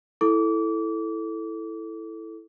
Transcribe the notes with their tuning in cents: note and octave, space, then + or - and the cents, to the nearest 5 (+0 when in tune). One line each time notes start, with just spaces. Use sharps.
E4 +0 A4 +0 D6 -30